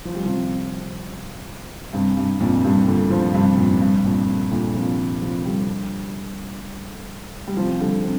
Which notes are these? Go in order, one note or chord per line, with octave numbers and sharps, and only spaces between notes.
F3
G3
C3 F3
G2 C3
G2
F2 A#2
G2 C3
A#2 D3
C3 F3
G2 C3
F2 A#2
G2
F2 A#2
A#2 D3
C3 F3
C3 F3
D3 G3
G3
C3 F3
D3 G3
C3